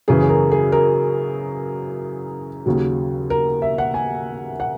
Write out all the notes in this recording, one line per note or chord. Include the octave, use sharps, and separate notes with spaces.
F#2 C#3 E3 G#4
G#4
A#4
G#4
A#4
D#2 C#3 F#3
A#4
E5
F#5
G#5
F#5